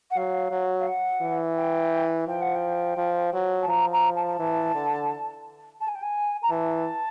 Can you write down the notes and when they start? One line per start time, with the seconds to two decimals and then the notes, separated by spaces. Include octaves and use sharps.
0.10 F#5
0.16 F#3 F5
0.51 F#3
0.79 F5
0.87 F#5
1.22 E3
1.56 G5
2.27 F3 G5
2.41 F#5
2.55 G5
2.97 F3
3.34 F#3
3.62 A5
3.68 F3 A#5
3.92 A#5
4.15 A5
4.39 E3
4.75 D3
5.80 A5
5.87 G#5
5.95 G5
6.02 G#5
6.42 A#5
6.50 E3 A5